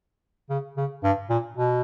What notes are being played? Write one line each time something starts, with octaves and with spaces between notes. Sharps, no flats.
C#3
C#3
G2
A#2
B2